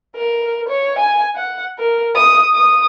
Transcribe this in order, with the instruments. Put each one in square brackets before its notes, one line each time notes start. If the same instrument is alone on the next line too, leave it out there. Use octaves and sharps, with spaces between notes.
[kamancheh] A#4
C#5
G#5
F#5
A#4
D#6
D#6